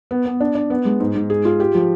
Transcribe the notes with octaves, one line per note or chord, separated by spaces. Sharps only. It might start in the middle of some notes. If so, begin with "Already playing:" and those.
B3
B3
D4
D4
B3
G#3
G#2
G#2
G#4
F4
G4
F3